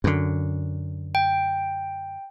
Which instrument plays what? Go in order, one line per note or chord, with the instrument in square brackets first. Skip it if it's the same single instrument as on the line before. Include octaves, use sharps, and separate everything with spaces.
[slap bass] F#2 D3
[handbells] G5